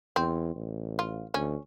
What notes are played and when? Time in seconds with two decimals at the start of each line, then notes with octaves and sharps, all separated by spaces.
0.16 E2 C4
0.55 A1
0.99 F4
1.34 D2 C#4